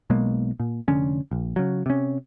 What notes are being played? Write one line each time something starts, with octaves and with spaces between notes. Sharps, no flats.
B1 B2 G#3 A#3
A#2
F1 D3 C#4
A#1
C#3 F#3
C3 C#4